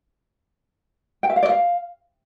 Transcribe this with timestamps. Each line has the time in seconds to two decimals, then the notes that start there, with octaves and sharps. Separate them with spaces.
1.23 G5
1.30 E5
1.36 F5
1.43 D5
1.49 F5